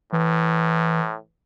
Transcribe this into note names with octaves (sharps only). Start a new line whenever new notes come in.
A2 E3